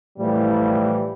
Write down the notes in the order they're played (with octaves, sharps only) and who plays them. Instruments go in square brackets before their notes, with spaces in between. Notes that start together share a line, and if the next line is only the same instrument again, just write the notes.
[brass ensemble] A2 E3 F3 G3